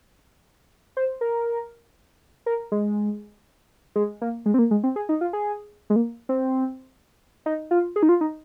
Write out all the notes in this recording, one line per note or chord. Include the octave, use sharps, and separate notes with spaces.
C5
A#4
A#4
G#3
G#3
A#3
G#3
C4
A#3
G#3
C4
G#4
D#4
F4
G#4
G#3
A#3
C4
D#4
F4
G#4
D#4
F4
D#4